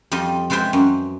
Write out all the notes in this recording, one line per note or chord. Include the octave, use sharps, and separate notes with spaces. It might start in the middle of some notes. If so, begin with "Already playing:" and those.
F2 G3 F4 D#5
G#3 F4 B4 C5 E5 G5
F#2